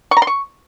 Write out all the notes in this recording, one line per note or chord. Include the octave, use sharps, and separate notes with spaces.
C#6
A#5
C6
C#6